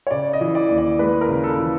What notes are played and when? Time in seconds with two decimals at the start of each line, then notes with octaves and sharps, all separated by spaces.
0.07 C#5
0.11 C#3 D5
0.33 D#5
0.41 E3
0.55 D5
0.71 D#2
0.78 D5
0.99 G#3 B4
1.21 A#4
1.29 C#3
1.44 A4
1.59 E3